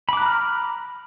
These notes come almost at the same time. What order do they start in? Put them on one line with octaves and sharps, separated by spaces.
B5 D6 F#6 A#5 F6